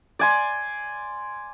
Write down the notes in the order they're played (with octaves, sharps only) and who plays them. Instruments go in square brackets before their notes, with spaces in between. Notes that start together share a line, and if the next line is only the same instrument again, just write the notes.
[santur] D5 G#5 C6